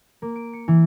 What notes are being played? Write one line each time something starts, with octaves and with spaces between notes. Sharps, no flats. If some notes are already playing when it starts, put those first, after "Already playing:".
A#3
D7
C#7
E3